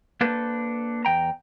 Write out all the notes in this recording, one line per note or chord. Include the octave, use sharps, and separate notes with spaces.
A#3 D4 A4 B4 C5
E2 G5 A#5